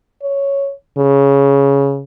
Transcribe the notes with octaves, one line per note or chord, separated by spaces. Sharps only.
C#5
C#3